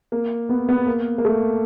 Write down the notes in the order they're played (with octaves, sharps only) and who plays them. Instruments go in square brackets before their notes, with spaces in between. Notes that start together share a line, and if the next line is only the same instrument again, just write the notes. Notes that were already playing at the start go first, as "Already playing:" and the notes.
[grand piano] A#3
B3
B3
A#3
A#3
A3